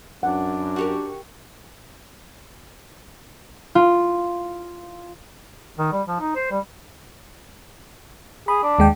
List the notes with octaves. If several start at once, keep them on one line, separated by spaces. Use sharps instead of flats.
F#2 D4 F#5
F#4 G4 A#4
F4
D#3
G3
F3
D#4
C5
G3
G#4 B5
D4
D#2 G#3 G5